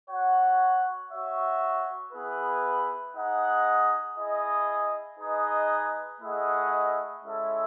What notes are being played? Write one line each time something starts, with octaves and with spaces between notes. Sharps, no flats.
F#4 C#5 F#5
F#4 C#5 E5
B3 E4 G#4 B4
D#4 G#4 D#5 F#5
E4 G#4 D#5
D#4 G#4 B4 D#5
A3 E4 G#4 D#5 F#5
G#3 C#4 E4 A4 E5